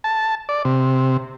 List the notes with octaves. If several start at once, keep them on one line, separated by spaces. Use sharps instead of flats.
A5
D5
C3